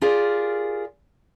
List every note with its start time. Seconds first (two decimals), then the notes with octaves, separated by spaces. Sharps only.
0.01 F4 G4 G#4 A#4 D5